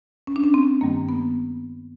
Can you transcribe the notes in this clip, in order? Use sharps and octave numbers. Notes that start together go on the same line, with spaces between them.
C#4
D4
C#4
C4
G2 D#3 G3 A#3
B3